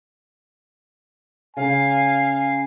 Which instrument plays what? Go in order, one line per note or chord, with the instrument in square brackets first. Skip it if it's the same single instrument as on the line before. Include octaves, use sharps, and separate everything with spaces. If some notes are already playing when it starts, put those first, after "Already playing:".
[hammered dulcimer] C#3 [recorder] F5 [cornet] G#5